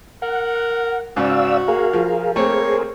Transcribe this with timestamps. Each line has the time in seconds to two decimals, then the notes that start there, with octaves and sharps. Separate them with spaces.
0.22 A#4 F#5
1.16 G#2 C#3 F#4 D5 F5 E6
1.68 A#3 G#4 A#4 F5
1.93 F3
2.36 A3 A#3 C4 G#4 A#4 C5 C#5